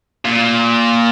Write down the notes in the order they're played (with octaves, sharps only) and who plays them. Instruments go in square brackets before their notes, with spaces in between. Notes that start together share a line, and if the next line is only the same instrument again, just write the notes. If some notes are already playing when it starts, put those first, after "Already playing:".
[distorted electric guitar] A#2